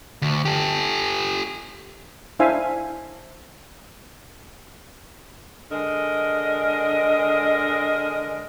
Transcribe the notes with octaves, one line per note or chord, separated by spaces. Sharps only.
D2
G4 A4
D4 E4 C5 E5 F5 G#5
D3 G#3 A#4 D#5